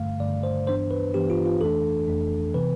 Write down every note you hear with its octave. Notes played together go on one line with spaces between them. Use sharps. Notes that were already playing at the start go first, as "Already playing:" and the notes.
Already playing: G2 D3 A3 F5
G2 D3 A3 D5
C5
G2 E3 B3 D4 C5
B4
G2 E3 B3 D4 G4
F4
F4
F2 E3 A3 D4 A4
F2 E3 A3 D4
C3 E3 B3 B4